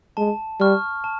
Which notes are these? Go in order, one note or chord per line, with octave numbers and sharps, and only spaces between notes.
G#3 A5
G3 C#6 F6
A5